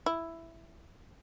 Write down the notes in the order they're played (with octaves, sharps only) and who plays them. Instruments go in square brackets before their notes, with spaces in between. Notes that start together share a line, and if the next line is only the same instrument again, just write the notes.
[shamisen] E4